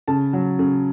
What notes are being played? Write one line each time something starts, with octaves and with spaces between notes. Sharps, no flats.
C#3 A5
F#3
C#3